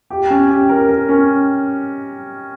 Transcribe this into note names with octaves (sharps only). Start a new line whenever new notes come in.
G4
C#4
G4
A#4
A#4
C#4